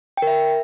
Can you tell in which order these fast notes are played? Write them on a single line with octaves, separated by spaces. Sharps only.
G5 A#4 E5